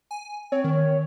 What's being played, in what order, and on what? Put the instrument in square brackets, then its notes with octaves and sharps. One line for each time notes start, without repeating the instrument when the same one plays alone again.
[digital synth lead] G#5
[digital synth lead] C4 [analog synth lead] C#5
[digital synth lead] D#3